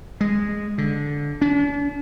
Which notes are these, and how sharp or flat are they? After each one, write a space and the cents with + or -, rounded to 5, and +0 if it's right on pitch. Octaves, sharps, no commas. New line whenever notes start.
G#3 -10
D3 -15
D4 -45